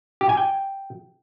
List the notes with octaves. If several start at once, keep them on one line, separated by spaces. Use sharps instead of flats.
G4
G#5
G5